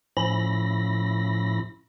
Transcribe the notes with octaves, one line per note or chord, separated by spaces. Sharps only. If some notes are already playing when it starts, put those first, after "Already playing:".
A2 F3 C#4 E4 B5 A#6